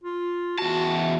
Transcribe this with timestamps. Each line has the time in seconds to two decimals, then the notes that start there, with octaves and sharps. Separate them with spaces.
0.04 F4
0.58 E2 F#4 A5